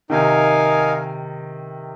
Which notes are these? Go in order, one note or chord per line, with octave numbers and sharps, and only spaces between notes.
C3 D#3 D#4 A#4 F5 G#5